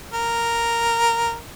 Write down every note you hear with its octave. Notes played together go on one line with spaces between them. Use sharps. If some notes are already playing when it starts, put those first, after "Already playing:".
A#4